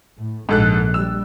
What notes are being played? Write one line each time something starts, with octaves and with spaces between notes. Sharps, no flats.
A2
A#1 G#2 A4 F#6
G3 E6